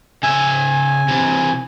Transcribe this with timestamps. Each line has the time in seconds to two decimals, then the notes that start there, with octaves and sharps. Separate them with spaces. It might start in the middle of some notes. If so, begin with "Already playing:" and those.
0.23 C#3 E5 G#5
1.08 C3 E3